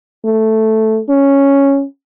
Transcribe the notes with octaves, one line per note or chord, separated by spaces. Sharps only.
A3
C#4